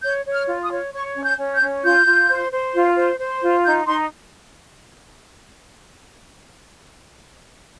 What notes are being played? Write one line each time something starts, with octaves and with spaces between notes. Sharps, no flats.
C#5 G6
C#5
F6
F4
D#6
C#5
C#5 C#6
C#4
G6
C#4
G6
C#4
F4 G6
F4
C5
C5
F4
C5
C5
F4
D#4 G6
D#4 C6